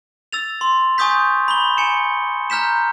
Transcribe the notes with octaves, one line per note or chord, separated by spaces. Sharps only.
E6 A6 F7
C6
G#5 C#6 D#6 G6 B6
B5 G7
G#5 C#7 E7
A#5 F6 G6 B6 E7